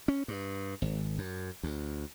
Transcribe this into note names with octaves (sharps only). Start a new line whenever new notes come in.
C#4
G2
G#1
F#2
D2